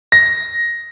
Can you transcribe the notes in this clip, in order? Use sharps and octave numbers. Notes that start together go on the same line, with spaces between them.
A#6